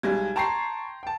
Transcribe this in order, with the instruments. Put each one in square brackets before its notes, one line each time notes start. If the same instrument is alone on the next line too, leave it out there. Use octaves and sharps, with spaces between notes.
[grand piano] B1 G#6 [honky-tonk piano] G3 G#3
[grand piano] G5 A#5 C6 [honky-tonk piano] A5 C#6 C7
[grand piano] G5 A5